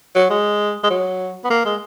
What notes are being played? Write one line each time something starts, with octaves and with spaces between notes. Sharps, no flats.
F#3
G#3
G#3
F#3
B3
A#3
G#3